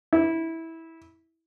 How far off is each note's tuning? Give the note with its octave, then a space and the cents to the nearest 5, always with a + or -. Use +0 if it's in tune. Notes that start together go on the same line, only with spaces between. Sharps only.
E4 -15